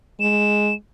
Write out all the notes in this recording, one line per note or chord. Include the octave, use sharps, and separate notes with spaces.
G#3 E7